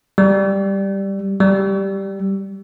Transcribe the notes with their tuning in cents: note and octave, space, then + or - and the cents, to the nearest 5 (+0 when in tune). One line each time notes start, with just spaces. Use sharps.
G3 +0
G3 -5